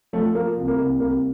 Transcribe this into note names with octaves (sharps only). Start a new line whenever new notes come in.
F3 A3
F3 A#3
C2
A#3
C2
C2 A#3